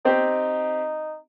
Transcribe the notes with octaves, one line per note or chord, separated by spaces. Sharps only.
C4 D#4 G4